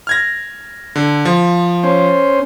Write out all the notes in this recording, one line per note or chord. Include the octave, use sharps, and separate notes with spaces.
F6 G#6 A#6
D3
F3
C#4 C5